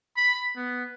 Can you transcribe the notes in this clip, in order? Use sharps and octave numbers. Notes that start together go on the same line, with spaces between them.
B5
B3